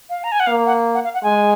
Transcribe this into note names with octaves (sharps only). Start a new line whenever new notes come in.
F5
A#5
G#5
F#5
A#3 F5
F#5
F#5
F5
F#5
G#3 G#5